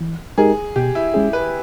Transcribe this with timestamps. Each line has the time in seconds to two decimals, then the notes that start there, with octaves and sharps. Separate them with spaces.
0.01 E3
0.38 G#3 D#4 G4 G#4 A#4
0.76 B2 G4
0.95 E4
1.14 G#3 C#4 G#4
1.33 B4